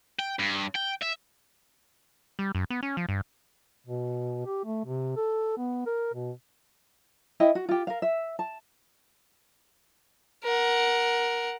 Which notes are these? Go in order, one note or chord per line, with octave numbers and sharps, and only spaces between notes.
G5
G2
G5
E5
G3
F#2
B3
C#4
F3
G2
B2
G4
A3
C3
A4
B3
A#4
B2
E4 D#5 G5
F#4
F4 G4
A#4 F5
E5
A5
A#4 F#5